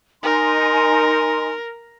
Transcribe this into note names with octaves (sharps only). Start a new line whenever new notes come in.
D#4 A#4 G#5 C6